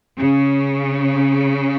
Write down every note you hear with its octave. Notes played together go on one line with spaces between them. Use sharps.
C#3